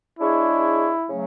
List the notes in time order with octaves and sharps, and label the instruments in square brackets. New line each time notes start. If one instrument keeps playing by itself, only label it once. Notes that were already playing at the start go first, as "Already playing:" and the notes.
[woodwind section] G#3 D4 G#4 C#5 [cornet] E4
[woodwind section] C#3 F#3 A3